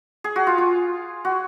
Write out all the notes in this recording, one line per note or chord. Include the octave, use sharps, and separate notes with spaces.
G#4
F#4
F4
F4
F#4